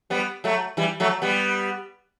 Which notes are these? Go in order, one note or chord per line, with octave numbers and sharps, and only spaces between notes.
G3 B3
F#3 A3
E3 G3
F#3 A3
G3 B3